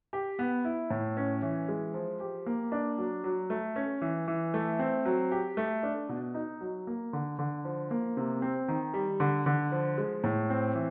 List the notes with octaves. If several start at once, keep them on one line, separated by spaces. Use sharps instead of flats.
G4
B3
E4
A2
C#4
E3
G#3
F3
G4
A#3
D4
F#3
F#3
A3
C#4
E3
E3
A3
C4
F#3
G4
A3
D4
B2
D#4
F#3
A#3
D3
D3
F3
A#3
C3
C4
D#3
G3
D3
D3
F3
G#3
A2
C4
E3